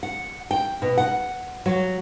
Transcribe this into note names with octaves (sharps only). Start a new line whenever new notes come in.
F#5
G5
B2
F#5
F#3